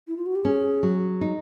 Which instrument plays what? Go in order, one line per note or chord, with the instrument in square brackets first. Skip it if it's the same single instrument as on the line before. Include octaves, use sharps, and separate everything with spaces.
[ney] E4
F4
F#4
G4
[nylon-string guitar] C#4 [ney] G#4
[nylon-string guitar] F#3
D#4